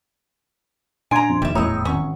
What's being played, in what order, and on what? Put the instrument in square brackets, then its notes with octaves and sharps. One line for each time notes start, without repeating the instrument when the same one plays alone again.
[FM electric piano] A#2 D4 C6 [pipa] G#5 A#5 [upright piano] G#6 D7
[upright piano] F2
[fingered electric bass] D#1 D#2 [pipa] G3 E5
[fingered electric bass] D#1 E2 [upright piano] A2 [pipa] G#3 C#5 [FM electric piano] A#5 D#6 E6
[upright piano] G#1 [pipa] C#4 C#6